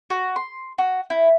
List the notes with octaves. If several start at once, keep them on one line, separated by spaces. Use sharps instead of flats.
F#4
C6
F#4
E4